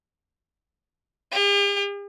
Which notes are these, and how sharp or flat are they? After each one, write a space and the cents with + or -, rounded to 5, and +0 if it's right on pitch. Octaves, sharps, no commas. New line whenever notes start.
G4 +45